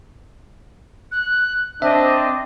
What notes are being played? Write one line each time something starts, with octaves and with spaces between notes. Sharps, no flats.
F#6
C4 D4 D#5 E5